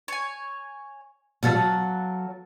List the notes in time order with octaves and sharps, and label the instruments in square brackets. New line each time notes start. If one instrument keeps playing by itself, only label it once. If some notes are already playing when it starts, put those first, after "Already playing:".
[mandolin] C#5 G#5
[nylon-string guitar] B2 F3 G3 [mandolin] A4 F5 F#5
[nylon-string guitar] F#3